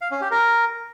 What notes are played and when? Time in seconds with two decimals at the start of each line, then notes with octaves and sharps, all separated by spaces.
0.01 F5
0.11 C#4
0.21 G4
0.31 A#4